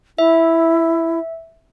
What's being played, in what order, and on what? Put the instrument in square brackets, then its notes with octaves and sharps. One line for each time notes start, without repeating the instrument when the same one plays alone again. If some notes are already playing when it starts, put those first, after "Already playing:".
[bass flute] E4 [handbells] E5